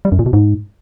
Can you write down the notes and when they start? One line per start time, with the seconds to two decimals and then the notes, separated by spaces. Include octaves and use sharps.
0.05 G3
0.12 F#2
0.19 A#2
0.26 B2
0.33 G#2